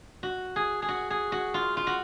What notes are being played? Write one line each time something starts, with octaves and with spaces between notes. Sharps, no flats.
F#4
G#4
G#4
F#4
G#4
F#4
F4
F4
F#4